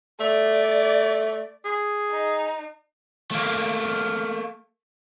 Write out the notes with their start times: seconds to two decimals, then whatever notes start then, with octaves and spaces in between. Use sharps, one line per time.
0.20 A3 D5
1.65 G#4
2.11 D#4
3.31 A3 A#3